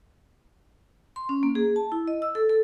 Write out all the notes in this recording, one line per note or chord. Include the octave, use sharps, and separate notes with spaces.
C6
C#4
A#3
G#4
A5
E4
D#5
E6
A4
A4